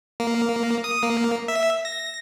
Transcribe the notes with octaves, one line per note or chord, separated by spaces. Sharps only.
A#3
D#6
A#3
E5
A#6